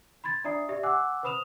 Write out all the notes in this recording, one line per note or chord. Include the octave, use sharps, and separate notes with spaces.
B5 C6 G#6 A6
D4 D5 E5 A#5 D#6 C7
G4 D5 E5
F#5 G#5 D6 E6 F#6
B4 C5 B5 D#6 E7 F7